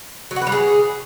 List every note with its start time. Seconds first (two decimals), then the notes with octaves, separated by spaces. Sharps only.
0.31 F#3
0.36 F#4
0.41 B4
0.47 G3
0.52 G#4